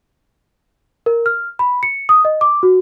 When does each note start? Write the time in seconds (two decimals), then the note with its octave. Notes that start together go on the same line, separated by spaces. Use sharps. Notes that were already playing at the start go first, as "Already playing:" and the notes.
1.06 A#4
1.26 F6
1.59 B5
1.83 C#7
2.09 D#6
2.25 D#5
2.41 D6
2.63 F#4